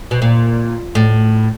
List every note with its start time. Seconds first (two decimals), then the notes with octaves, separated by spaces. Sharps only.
0.11 B2
0.22 A#2
0.95 A2